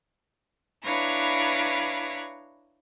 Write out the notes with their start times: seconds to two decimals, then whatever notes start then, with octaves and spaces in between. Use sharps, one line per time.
0.83 D4 E4 B4 C#5 F5 A#5